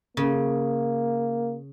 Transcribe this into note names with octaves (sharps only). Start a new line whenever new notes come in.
C#3 A#3